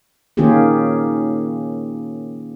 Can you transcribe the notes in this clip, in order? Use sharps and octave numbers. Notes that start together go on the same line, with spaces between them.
D#3 A#3 C#4 F4 G4 G#4